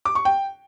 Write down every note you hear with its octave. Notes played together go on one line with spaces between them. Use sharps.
D6
C#6
G5